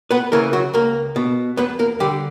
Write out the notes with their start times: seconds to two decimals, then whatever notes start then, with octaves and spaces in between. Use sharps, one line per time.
0.11 B3 B4
0.32 C#3 E3 A#3 A#4
0.53 F#3 F#4
0.73 C#2 A#3 A#4
1.16 B2
1.57 E2 B3 B4
1.79 A#3 A#4
2.00 D3 G3 G4